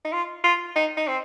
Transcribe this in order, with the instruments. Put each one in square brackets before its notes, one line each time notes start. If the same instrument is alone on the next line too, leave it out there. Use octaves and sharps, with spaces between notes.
[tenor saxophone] D#4
F4
F4
D#4
D#4
C4